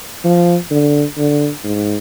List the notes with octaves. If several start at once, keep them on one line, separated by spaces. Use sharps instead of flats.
F3
D3
D3
G#2